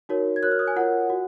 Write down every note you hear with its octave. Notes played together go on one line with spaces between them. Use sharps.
D#4 F#4 A#4 C#5
G#6
F#4 A#4 C#5 F#6
F6
D#6
G#5
F4 A#4 C#5 F#5
F#4